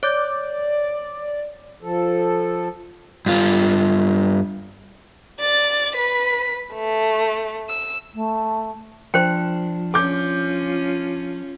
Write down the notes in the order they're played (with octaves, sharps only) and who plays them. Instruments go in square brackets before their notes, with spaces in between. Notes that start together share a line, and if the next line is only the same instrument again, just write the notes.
[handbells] C#5 D6 G6 [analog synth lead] D5
[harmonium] F3 A4
[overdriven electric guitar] G2 F4
[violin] D5 A6
B4 B6
A3
E6
[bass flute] A3
[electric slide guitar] F3 D4 [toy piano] C5 G5
[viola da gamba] C#4 F4 [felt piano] D6 G6